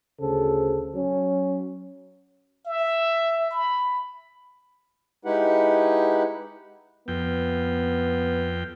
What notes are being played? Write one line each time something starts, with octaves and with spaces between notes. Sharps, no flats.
D2 C#3 A4 C5
F#3 C#4
E5
B5
G#3 D#4 E4 G4 B4 F#5
F2 B3 G5